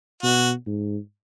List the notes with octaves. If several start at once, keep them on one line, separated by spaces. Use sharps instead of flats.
B2 F#4
G#2